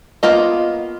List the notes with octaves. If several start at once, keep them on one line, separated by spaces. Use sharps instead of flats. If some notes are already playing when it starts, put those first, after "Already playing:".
A#3 B3 F4 D#5